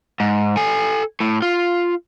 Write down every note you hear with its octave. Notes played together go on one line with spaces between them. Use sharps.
G#2
A4 G#5
A2
F4